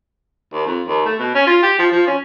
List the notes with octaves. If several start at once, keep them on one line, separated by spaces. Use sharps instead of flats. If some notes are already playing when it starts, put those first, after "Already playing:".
D#2
F2
D#2
A3
B2
C#4
F4
G4
F3
F3
C#4